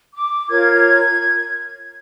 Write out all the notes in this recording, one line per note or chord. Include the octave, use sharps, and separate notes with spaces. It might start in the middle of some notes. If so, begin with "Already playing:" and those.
D6
F4 A#4 C#5 G#6